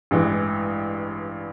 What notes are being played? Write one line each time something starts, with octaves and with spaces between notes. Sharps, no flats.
A1 G2 E3 G#3